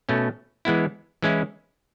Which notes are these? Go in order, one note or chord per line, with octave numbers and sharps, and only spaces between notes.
B2 A3 C#4
E3 G#3 B3 E4
E3 G#3 C#4 E4